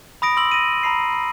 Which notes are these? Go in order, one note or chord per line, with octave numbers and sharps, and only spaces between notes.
B5 D#6 A#6 D7
C6 E6 F#7
A#6 D#7
A#5 B5 C7